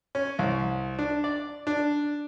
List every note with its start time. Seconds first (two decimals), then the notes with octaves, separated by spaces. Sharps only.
0.15 C#4
0.39 C2
0.99 D4
1.24 D5
1.67 D4